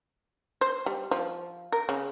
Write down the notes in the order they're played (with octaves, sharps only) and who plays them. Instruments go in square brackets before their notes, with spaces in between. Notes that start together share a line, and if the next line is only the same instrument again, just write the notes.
[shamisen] C5
G3
F3
A#4
C#3